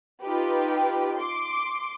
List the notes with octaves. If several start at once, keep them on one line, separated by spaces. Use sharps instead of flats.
D#4 F4 G4 B4
C6 D6